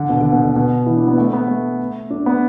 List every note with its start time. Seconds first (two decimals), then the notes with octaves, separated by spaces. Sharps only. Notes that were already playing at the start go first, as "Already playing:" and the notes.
Already playing: D3
0.09 B2
0.21 D3
0.32 B2
0.44 D3
0.56 B2
0.86 E3
0.97 D4
1.08 B3
1.18 A3
1.33 B3
1.48 A3
2.10 D4
2.26 B3